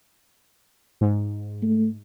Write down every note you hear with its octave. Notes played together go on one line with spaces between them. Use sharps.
G#2
A3